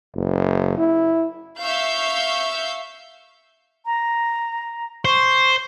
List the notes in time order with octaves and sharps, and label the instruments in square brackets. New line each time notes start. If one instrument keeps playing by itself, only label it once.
[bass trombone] F#1
E4
[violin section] E5 F5 C#6 E6 G6
[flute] A#5
[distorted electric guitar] C5 [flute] C#6